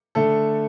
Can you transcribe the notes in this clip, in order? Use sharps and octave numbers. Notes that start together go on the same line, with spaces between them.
D3 A3 A4